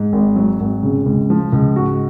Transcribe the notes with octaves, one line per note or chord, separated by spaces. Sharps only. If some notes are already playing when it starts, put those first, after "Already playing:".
Already playing: G#2
G#1
F#3
G#1
C#3
C#2
F3
C#2
G#2 F#4